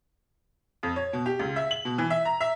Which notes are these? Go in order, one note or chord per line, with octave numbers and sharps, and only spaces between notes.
F2
C#5
B2
G4
C#2
E5
F#7
B2
E3
E5
A#5
E5